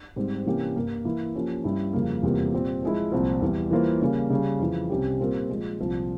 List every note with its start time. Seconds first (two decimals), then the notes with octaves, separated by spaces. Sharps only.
0.16 G#2 G3 C4
0.46 C3 E3 A#3 C#4 G4
0.76 G2 G3 A#3
1.05 E3 A#3 E4 A#4
1.35 F3 A#3 C#4 G4
1.64 G2 G3 C#4 E4 G4
1.93 F2 C#3 G3 A#3
2.23 E2 C3 G3 A#3 F4
2.53 A#2 G3 C4
2.82 F3 G#3 E4
3.12 C2 A#2 F3 C4
3.41 E2 E3 G3
3.71 E3 G3 A#3 F4 C5
4.01 C#3 G3 A#3 C#4
4.30 C#3 G3 C#4
4.60 F2 C#3 E3
4.89 C2 C3 G3 C#4 G4
5.20 A#2 G3 C4 F4 A#4
5.49 A#2 F3 G#3
5.79 C2 A#2 F3 C4 F4